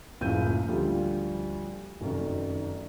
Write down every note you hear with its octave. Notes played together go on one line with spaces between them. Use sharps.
F#1 C#2 A2 F3 G6 D#7
D2 F3 G3
F1 F#2 D#3